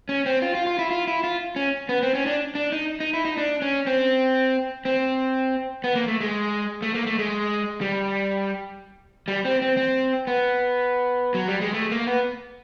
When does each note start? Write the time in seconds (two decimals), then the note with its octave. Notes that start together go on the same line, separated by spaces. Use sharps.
0.09 C#4
0.26 C4
0.42 F4
0.55 F4
0.66 F4
0.79 E4
0.91 F4
1.07 E4
1.24 F4
1.56 C#4
1.89 B3
2.02 C4
2.15 C#4
2.26 D4
2.55 D4
2.72 D#4
3.00 D#4
3.13 E4
3.25 D#4
3.37 D4
3.62 C#4
3.87 C4
4.85 C4
5.84 B3
5.95 A#3
6.08 A3
6.20 G#3
6.82 A3
6.95 A#3
7.06 A3
7.19 G#3
7.81 G3
9.28 G3
9.45 C4
9.62 C4
9.77 C4
10.27 B3
11.34 F#3
11.48 G3
11.61 G#3
11.74 A3
11.91 A#3
12.07 B3